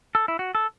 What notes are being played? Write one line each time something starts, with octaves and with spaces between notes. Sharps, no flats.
A4
E4
F#4
A4